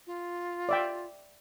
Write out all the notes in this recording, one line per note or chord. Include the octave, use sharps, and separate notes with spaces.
F4
D5 E5 G5